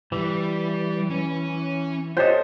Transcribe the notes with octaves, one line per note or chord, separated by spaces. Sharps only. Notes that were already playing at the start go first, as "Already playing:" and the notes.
E3 G3
C#4
F4 G4 A4 C5 C#5 D#5